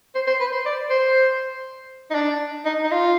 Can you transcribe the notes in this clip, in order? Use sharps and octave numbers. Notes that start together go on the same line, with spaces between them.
C5
C5
B4
C5
D5
C5
D#4
D4
D#4
D#4
F4